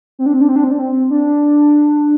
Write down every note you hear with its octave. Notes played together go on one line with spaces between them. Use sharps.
C4
D4
C4
D4
C4
D4
C4
D4
C4
D4